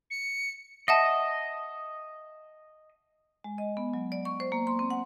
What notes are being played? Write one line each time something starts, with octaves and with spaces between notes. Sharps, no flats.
C#7
D#5 E5 F#5 A5
G#3
D#5
B3
F#3
D5
C#6
C5
A#3
C6
C4
F#5